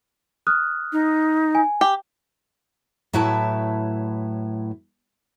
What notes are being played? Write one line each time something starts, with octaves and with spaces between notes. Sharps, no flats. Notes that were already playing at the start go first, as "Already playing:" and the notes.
D#6 F6 F#6
D#4
G#5
G4
A2 F#3 E4 B4 E5 A5